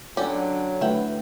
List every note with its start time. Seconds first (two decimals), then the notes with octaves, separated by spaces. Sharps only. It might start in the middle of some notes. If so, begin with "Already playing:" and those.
0.17 D3 F#3 C#4 G4 D5
0.81 D3 A3 E4 B4 E5 F#5 G5